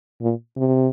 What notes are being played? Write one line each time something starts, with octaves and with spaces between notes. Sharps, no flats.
A#2
C3